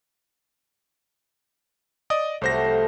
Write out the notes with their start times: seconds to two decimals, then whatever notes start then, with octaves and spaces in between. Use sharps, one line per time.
2.10 D5 D#5 D#6
2.41 C2 F#3 G3 A3 C5 A#6
2.64 F3